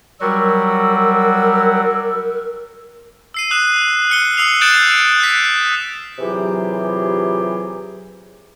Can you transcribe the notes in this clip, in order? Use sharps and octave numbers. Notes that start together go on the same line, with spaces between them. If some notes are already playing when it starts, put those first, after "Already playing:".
F#3 G3 F#4 A#4 E6
E6 C7 D#7
D#6 F#6 E7
F6 C#7 G7
D#6 E6 C7 F7
D#6 F#6 G6 A6 D7 E7
F#6 B6
C3 E3 F#3 F4 G4 G#4